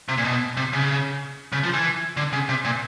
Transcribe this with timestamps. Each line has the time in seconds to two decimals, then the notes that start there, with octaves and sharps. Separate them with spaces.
0.09 C3
0.18 A#2
0.24 B2
0.57 C3
0.73 C#3
1.52 C#3
1.63 F3
1.74 E3
2.17 D3
2.33 C#3
2.49 C3
2.65 A#2